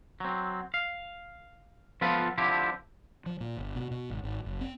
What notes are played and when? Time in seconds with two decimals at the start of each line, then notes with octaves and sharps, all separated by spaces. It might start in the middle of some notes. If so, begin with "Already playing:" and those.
0.20 F#3 C4
0.74 F5
2.01 F3 B3 F4 A4 B4
2.38 D3 F3 C4 E4 G4
3.26 F3
3.40 A#2
3.57 G1
3.76 B2
3.91 B2
4.10 G#1
4.23 G#1
4.45 F#1
4.61 C4